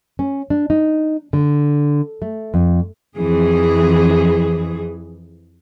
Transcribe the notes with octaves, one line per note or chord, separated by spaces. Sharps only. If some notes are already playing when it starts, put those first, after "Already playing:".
C#4
D4
D#4
D3
A3
F2
F2 E3 G#4